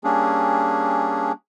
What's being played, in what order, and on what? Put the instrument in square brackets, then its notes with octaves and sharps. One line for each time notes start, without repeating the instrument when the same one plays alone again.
[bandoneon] G3 A#3 C#4 D4 G#4